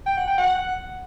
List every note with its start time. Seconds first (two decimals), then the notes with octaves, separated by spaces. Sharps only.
0.06 G5
0.17 F#5
0.27 G5
0.38 F#5